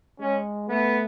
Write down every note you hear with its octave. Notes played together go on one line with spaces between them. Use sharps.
G#3 C#4
A3 B3